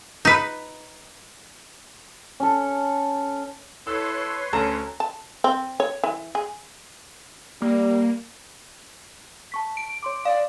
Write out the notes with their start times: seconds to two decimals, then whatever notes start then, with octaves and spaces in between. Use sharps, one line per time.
0.25 D#4 B4
2.40 C#4 A4
3.87 E4 A4 B4 C#5 C6 E6
4.53 D2 C#4 A4 A#5 E7
5.00 A5
5.44 C4
5.80 C#5
6.04 E3
6.35 G#4
7.62 G3 A#3
9.52 A5 C#6 B6
9.77 D7
10.03 C#5 C6 D6
10.25 D5 F5